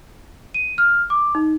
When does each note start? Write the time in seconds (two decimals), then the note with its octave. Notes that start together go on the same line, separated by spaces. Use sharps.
0.54 D#7
0.78 F6
1.10 D6
1.35 D#4